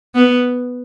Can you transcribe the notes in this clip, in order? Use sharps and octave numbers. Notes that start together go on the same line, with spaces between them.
B3